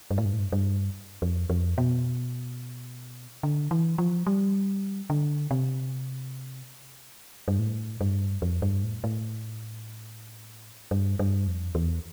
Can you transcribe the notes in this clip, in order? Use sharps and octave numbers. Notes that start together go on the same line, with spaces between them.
G2
A2
G2
A2
G2
G2
F2
F2
B2
D3
E3
F3
G3
D3
C3
G2
A2
G2
F2
G2
A2
A2
G2
G2
F2
E2